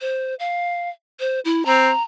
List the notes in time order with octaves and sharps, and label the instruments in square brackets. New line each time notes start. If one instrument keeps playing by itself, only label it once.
[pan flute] C5
F5
C5
E4
[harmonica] C4 [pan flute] A#5